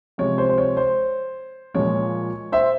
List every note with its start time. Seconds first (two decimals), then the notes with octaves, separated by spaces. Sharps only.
0.18 C3 F3 G#3 C#5
0.38 C5
0.49 C5
0.58 C#5
0.77 C5
1.74 A#2 F3 G#3 C#5
2.52 C5 E5